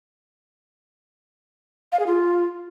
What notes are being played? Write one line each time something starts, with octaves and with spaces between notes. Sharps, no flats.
F5
G#4
F4